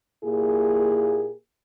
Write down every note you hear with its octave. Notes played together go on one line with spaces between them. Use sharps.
A#2 A#3 E4 G4 G#4